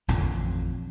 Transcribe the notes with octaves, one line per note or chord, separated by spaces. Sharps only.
A1 F2 A#2 D3